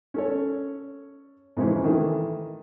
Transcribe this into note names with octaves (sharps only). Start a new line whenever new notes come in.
C#4 A4 C#5
F2 G#2 C3 E3 C#4
D#3 E3 A3